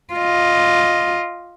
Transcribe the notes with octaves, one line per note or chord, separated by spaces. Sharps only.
F4 D#5